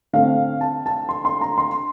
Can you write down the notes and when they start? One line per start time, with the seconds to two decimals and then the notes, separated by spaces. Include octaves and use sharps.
0.13 D3 A3 C4 F5
0.61 A5
0.86 A5
1.09 C6
1.25 C6
1.41 A#5
1.58 C6